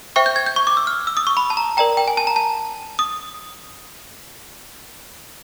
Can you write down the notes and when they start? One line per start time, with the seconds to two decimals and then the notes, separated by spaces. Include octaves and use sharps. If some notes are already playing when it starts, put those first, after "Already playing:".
0.16 C5 E5 G5 C#6
0.26 G6
0.36 G#6
0.46 G6
0.56 C#6
0.67 D6
0.77 E6
0.87 F6
1.07 E6
1.17 D#6
1.27 C#6
1.37 B5
1.50 A5
1.57 A#5
1.77 A#4 D5 G5 A#5
1.97 G5
2.08 G#5
2.17 A5
2.27 A#5
2.36 A5
2.99 D#6